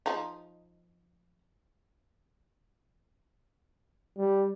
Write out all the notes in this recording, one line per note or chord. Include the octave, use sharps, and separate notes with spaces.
F3 D#4
G3